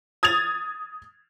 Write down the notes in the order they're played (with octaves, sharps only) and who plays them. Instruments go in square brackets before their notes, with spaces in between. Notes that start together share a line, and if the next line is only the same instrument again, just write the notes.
[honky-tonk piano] D#6 G#6 A6 F7